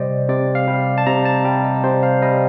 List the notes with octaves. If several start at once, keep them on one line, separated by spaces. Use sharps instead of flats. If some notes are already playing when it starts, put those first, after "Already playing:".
Already playing: C3 G3 C5 D5 D#5
C3 D5
F5
G3
A5
C3 A#5
A5
G3 G5
D#5
D5
C3 C5
F5
G3 D#5